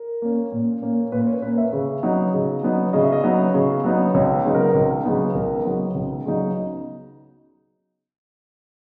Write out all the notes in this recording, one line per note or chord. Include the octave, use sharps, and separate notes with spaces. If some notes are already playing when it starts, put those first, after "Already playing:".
Already playing: A#4
A#3 C#4
A#2
A#3 C#4
A#2 B4
C#5
A#3 C#4 B4
E5
C#3
F#3 B3 D#4
C#3
F#3 B3 D#4
C#3 D#5
E5
D#5
F#3 B3 D#4
C#3
F#3 B3 D#4
C#2 C#5
B4
C#3 F#3 B3 D#4
A#4
C#2
C#3 F#3 B3 D#4
C#2 A#4
C#3 F#3 B3 D#4
C#2
C#3 F#3 B3 D#4